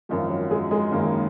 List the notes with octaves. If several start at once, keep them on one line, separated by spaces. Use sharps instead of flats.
G#1 F#2 D#3 F3 F4
F#3 F#4
G#3 G#4
G#3 G#4
G#1 F#2 D#3 A#3 A#4